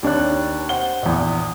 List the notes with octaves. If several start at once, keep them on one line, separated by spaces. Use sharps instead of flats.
D#2 D4 C#5 F#6
C5 F#5 G7
A#1 E2